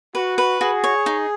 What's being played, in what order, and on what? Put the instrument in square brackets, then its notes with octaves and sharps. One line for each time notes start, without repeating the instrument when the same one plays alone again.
[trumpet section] F#4 [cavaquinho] B4
[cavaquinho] B4
[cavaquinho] F#4 [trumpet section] G#4
[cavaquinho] C#5
D#4